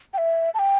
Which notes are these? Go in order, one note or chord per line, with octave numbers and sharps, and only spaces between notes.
G5
E5
A5
G5